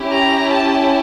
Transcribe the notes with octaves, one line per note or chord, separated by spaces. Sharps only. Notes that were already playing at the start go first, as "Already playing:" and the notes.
Already playing: C#4 E4 G4
A#5
A5